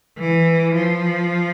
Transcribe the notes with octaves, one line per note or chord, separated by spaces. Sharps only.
E3
F3